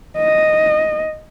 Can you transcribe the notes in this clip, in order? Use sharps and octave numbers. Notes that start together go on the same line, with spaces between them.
D#5